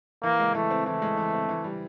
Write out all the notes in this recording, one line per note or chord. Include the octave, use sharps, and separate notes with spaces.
E3 A#3
G#3
E3 A3
C4
E3 A3
G#3
E3
C4
E3
G3